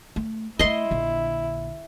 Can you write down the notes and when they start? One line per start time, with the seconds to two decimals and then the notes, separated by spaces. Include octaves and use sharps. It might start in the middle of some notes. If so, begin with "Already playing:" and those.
0.16 A3
0.59 A3 B3 E4 D#5 C6
0.91 A#1 D3